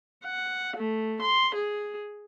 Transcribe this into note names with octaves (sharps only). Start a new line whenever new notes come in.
F#5
A3
C6
G#4